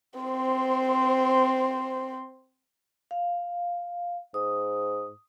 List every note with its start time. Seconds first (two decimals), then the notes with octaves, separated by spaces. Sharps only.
0.20 C4 C5
3.11 F5
4.34 G#2 D#6